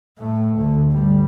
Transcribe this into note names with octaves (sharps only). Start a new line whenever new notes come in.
A2 A3
D2 D3
G1 G3